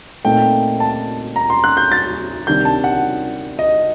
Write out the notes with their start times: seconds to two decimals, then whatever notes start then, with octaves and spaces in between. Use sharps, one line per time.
0.25 A#2 A3 C4 D#4 G5
0.80 A5
1.36 A#5
1.50 C6
1.64 F#6
1.77 G6
1.92 A6
2.47 C3 D#3 G3 D4 G6
2.65 A5
2.84 F#5
3.59 D#5